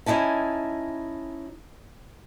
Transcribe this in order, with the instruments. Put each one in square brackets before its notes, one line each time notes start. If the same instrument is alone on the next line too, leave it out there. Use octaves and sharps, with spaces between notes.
[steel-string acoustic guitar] C#4 D#4 E4 G#5 A5